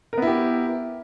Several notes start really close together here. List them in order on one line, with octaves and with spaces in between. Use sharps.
A#4 B3 E4 G4